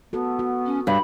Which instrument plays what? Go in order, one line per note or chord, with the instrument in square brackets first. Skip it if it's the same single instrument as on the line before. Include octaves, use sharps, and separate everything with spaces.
[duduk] B3 [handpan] F#4 A4
[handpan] F#4
[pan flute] C#4
[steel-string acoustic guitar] G2 [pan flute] B5